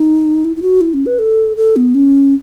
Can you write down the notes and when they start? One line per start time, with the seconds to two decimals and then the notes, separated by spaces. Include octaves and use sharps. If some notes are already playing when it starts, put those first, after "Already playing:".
Already playing: D#4
0.45 E4
0.56 E4
0.62 F#4
0.81 E4
0.94 C#4
1.06 B4
1.19 A4
1.57 A4
1.76 B3
1.94 C#4